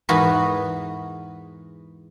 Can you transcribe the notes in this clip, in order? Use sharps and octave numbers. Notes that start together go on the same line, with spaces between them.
E2 G#2 B3 F#4 A#4 B4